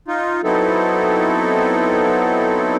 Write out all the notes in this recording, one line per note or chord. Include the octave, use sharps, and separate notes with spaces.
D#4 F4
F#3 B3 C4 D#4 E4 A4